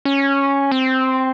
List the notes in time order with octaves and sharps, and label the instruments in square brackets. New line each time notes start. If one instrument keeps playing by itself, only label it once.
[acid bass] C#4
C4